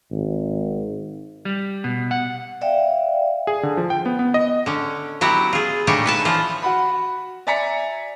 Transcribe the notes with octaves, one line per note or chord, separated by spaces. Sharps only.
G#1
G3
B2
F#5
D5 E5 F5 G5
G#4
D3
F3
G5
B3
B3
D#5
D3 C#4
F#3 B3 E4 F#4 G4
F4 G#4
A#2 G3 A3 D4 D#4 C#5
B4 G#5 A5
E3 F3 F4
F#4 F#5 B5
D5 E5 G#5 A#5 B6 C#7